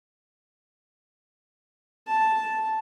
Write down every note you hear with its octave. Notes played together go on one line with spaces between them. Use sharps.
A5